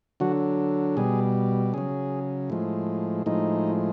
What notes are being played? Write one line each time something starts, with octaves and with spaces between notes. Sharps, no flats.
D3 F#3 F#4
B2 G3 G#4
C#3 F#3 G#4
A2 F3 G#3
A2 F3 G#3 D#4